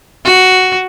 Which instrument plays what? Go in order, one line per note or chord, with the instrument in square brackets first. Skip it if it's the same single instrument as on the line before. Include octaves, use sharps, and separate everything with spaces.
[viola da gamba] F#4